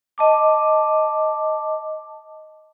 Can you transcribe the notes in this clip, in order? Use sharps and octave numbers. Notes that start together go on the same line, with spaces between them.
D#5 A5 D6